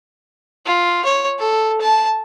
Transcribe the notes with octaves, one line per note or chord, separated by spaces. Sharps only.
F4
C#5
A4
A5